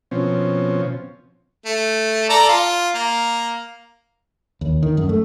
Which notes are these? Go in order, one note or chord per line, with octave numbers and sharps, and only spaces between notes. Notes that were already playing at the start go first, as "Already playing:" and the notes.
B2 F3 C4 C#4
A3
A4 D5 A#5
F4
A#3
D#2
D#3
F#2
A3